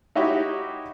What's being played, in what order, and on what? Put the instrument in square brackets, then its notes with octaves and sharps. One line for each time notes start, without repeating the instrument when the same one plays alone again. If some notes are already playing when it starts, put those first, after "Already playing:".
[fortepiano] D#4 E4 F#4 G4 C#5 E5